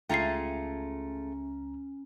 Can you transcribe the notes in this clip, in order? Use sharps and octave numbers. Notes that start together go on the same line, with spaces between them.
C#2 A3 C#4 F4 G#4 G5 A#5 C7